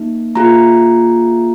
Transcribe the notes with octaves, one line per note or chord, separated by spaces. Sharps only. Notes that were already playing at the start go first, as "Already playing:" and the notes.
Already playing: A#3 D#4
A#3 F4 G#4 A#5